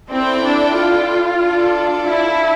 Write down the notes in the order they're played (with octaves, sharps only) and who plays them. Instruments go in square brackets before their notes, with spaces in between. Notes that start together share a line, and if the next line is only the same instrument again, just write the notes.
[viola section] C4 [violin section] E4 A4 D5 G5
[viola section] D4
F4
[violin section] D4 A4 D5
[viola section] E4